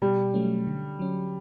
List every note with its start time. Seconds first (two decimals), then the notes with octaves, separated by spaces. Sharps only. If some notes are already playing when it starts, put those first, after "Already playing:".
0.02 B2 G3
0.34 F#3 A3 C#4
0.67 D3
0.99 F#3 C#4